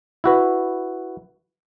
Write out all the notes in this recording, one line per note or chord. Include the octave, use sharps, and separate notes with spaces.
E4 F#4 B4